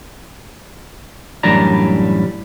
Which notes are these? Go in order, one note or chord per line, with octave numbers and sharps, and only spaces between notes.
F#2 A2 E3 G3 D4 A#5